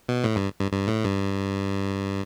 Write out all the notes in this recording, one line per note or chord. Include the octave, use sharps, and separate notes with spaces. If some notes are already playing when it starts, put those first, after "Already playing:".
B2
A2
G2
G2
G2
A2
G2